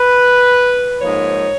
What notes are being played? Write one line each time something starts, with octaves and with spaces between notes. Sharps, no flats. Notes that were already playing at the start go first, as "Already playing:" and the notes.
Already playing: B4
G#2 F3 A#3 D#4 C#5